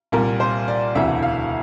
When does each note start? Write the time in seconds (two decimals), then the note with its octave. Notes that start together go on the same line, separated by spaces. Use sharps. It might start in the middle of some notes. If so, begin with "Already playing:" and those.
0.12 C2 A#2 G3 A#4
0.40 C5
0.68 D5
0.95 E1 D2 C3 E3 E5
1.23 F5